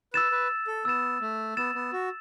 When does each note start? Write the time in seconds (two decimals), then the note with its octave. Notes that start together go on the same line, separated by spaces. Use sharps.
0.13 B4 E6 A6 E7
0.32 B4
0.67 A4
0.85 B3 E6 A6 E7
1.21 A3
1.57 B3 E6 A6 E7
1.75 B3
1.93 F#4